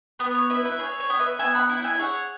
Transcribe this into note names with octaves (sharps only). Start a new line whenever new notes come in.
B3 B4
C#5
E4 B4 E5
B4 E5
G#4 C#5
C#5
B3
B4 E5
B3 E5 G#5
F#5 B5
E4
F#5
E5 G#5
E5
G#4 C#5 F#5